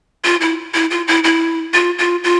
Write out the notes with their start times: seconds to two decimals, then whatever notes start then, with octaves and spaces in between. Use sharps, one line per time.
0.24 F4
0.41 E4
0.74 E4
0.91 F4
1.07 E4
1.24 E4
1.74 F4
1.98 F4
2.24 F4